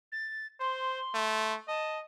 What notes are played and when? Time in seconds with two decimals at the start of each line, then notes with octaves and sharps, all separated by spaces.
0.12 A6
0.60 C5 C6
1.14 A3
1.68 D#5 A5